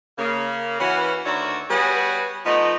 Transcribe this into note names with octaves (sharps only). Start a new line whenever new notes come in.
C#3 A#3
E3 C#4 F#4
D2 D#3 F#4 C#5 D5 E5
G3 B3 F#4 G#4 B4 C#5
F3 A3 B3 D#4 D#5